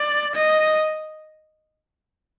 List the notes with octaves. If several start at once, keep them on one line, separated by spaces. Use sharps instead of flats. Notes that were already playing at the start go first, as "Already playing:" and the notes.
Already playing: D5
D#5